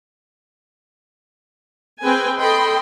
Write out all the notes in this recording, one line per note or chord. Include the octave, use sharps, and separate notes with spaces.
C4 G#4 B4 G5 G#5
A4 D#5 G5 B5 C6